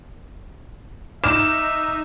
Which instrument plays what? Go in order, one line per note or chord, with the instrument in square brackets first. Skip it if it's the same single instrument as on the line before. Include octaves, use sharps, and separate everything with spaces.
[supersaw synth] D#4 [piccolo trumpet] E5 [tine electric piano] D6 F6 [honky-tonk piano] E7